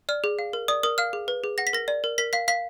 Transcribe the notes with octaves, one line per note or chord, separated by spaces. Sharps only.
D5 F6
G#4
F5
A#4
D5 D#6
A#4 D#6
F5 F6
G#4
B4
G#4
F#5 A#6
B6
A#4 A#6
D5
A#4
A#4 B6
F5 B6
F5 B6